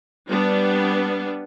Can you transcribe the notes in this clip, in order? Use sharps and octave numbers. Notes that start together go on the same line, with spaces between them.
G3 B3 D4